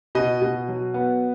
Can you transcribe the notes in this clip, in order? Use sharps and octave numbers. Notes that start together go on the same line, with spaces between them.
B2 D#5
B2
F#3
B3